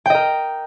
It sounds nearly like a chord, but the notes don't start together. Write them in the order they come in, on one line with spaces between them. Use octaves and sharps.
G5 D#5 A#4